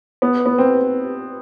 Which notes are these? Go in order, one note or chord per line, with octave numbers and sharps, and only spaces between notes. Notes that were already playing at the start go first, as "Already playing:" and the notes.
B3
B3
C4